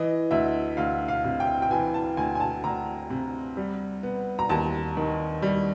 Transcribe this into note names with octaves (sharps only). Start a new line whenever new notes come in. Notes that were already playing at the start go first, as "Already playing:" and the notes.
Already playing: E3 D#5
D2 E5
D2 F5
F5
C3
G5
G5
E3 G#5
A5
D2 G#5
G#5
A5
D2 A#5
C3
G3
B3
A#5
D#2 A5
D#3
G3